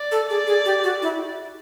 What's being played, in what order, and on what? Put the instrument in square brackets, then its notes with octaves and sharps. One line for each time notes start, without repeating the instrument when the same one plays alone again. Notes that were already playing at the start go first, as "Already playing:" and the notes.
Already playing: [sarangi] D5
[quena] A4
[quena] G#4 [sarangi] D5
[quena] G#4
G4
F#4
E4